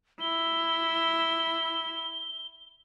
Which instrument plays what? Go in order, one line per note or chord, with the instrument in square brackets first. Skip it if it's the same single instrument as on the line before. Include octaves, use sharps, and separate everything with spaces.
[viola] E4 [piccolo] G7